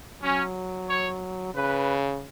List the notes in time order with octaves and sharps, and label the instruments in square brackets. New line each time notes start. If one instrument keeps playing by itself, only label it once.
[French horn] F#3 [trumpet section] C#4
[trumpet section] C#5
[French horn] C#3 [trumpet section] B4